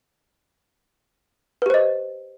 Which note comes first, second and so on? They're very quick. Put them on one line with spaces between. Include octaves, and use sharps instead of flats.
B4 G4 C5 D#5